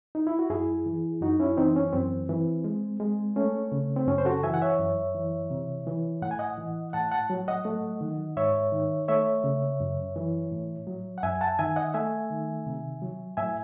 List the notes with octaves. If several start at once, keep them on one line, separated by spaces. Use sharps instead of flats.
D#4
E4
F#4
F#2 E4 G#4
E3
F#2 D#4 F#4
C#4 E4
E3 C4 D#4
C#4
F#2 C4
E3
G#3
G#3
A3 C#4
C#3
C4
F#2 C#4
C5
F#4 A4
E3 E5 G#5
F#5
C#5 E5
F#2
E3
C3
E3
A2 F#5
G#5
D#5 F#5
E3
A2 F#5 A5
F#5 A5
F#3
D#5 F#5
A3
D#3
G#2 C#5 E5
D#3
A3 C#5 E5
C#3
F#2
E3
A2
F#3
F#5
F#2 E5 G#5
F#5 A5
D#3 E5 G#5
D#5 F#5
A3 E5 G#5
D#3
C3
F#3
A2 E5 G#5